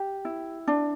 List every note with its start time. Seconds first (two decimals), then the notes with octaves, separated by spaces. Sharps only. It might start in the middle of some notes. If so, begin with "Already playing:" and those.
Already playing: G4
0.25 E4
0.67 D4